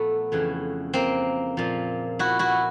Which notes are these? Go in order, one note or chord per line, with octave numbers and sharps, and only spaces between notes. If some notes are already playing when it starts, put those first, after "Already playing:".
Already playing: A#2 F3 A3 B3
F2 C#3 E3
A#3 C4
A#2 F3
E4 F#4
E4 F#4